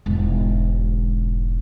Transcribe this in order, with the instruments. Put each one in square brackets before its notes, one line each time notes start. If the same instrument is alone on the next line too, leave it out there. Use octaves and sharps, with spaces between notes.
[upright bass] E1 G#2